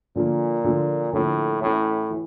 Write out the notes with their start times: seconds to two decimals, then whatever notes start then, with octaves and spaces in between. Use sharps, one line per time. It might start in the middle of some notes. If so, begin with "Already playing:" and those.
0.16 A#2 D3 F3 A#3
0.64 D3 F3 A#3
1.13 A2 D3 F3 A#3
1.62 A2 E3 A3 C#4 E4
2.10 E3